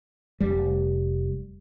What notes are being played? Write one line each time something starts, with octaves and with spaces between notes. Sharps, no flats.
F1 G3